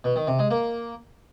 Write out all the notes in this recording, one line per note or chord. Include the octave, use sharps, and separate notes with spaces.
B2
D#3
C3
G#3
A#3